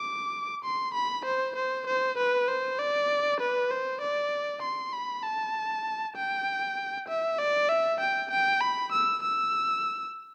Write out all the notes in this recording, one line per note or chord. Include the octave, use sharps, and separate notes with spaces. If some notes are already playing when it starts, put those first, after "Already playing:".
Already playing: D6
C6
B5
C5
C5
C5
B4
C5
D5
B4
C5
D5
C6
B5
A5
G5
E5
D5
E5
G5
G5
B5
E6
E6